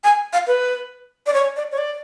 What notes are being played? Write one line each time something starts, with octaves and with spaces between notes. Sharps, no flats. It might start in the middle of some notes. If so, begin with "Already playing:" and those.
G#5
F5
B4
D5
C#5
D5
C#5
D5